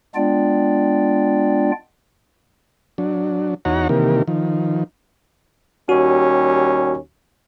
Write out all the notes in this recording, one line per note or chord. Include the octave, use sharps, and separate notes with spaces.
G#3 B3 D4 F4 D5 G5
F#3 D4
E2 D#4 F#4 C#5 F#5 A#5
C3 D#3 E3 A#3 G4 A#4
D#3 F3
D#2 G3 C#4 F#4